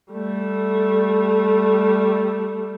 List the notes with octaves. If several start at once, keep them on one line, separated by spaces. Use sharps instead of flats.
G3 A3